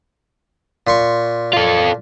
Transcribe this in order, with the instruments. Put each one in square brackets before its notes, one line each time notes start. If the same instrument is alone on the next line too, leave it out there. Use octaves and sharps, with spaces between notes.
[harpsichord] A#2 C6 C#6
[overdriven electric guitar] F4 A4